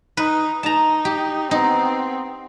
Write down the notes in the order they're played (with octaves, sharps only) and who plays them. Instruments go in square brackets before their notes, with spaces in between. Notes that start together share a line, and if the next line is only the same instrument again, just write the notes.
[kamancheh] D#4 [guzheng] B4
[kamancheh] D#4 [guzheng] A5 A#5
[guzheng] G4
[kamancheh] B3 C4 [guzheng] D#4